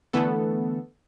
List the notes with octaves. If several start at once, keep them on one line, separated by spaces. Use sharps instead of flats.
D3 E3 A3 B3 A4